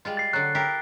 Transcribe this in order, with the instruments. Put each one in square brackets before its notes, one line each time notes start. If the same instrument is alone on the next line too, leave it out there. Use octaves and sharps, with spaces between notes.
[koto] G3 G#3 F4
[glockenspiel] A6 C7
[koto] D3 F#3 [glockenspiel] F#6
[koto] E4 G4 A#4